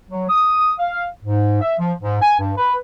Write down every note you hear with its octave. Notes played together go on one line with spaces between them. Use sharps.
F#3
D#6
F5
G#2
E5
F3
G#2
G#5
G2
B4